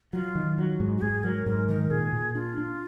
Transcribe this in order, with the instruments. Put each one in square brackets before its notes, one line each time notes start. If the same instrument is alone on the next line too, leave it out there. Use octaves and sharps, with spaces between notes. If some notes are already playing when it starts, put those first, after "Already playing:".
[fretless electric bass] F#3 [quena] F4
[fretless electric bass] D#3
[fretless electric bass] F#3 [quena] F#4
[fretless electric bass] G#2
[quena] F#4
[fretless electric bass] G#2 [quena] G#4
[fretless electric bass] F#3 [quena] A#4
[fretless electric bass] G#2 [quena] A#4
[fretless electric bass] D#3 [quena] A#4
[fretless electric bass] A#2 [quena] G#4
[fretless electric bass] A#2
[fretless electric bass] D4 [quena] F4
[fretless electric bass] D4